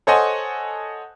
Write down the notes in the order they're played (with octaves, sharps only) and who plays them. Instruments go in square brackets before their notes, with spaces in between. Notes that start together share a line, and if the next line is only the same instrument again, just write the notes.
[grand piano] A4 C5 C#5 D#5 F#5 G#5